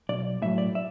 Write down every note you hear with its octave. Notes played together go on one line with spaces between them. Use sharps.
B1 D5
A2 F#3 E5
D5
E5